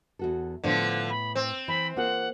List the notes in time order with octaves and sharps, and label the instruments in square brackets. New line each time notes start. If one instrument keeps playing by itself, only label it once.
[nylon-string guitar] E2 F#4 A4
[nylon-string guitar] A2 B3 [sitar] D3 F3
[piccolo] B5
[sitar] C4 [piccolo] E6
[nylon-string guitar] E3 [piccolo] B5
[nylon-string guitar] A#3 F4 G#4 [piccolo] F#5